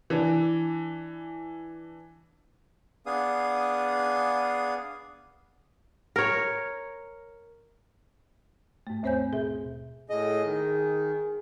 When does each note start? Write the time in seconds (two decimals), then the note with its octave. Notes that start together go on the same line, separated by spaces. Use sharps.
0.10 E3 D4
3.06 B3 D4 G#4 F5 D#6
6.16 A#4 C#5
8.87 G#2 A3
9.03 D#2 C4 C5 C#5 G#5 G6
9.32 B2 G#4 E5
10.10 A2 G#4 D#5
10.44 D#3